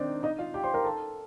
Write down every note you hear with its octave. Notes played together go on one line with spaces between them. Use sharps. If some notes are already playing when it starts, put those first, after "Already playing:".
Already playing: D#3 C4 D4 D#4 D5
D#4 D#5
F4 F5
G4 G5
C5 C6
A#4 A#5
A4 A5